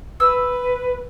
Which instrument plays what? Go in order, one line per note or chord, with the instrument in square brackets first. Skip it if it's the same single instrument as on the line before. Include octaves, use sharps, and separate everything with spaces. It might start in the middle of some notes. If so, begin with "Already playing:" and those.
[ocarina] B4 [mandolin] E6